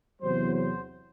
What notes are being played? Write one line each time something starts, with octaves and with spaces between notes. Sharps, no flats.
E2 C3 F#3 C5
C5